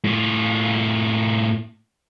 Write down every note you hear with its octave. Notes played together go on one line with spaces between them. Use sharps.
A2 F4